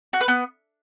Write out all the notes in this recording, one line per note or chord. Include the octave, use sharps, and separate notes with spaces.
F#4
B4
B3